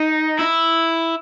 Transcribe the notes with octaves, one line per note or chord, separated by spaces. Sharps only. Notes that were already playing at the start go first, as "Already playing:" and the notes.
Already playing: D#4
E4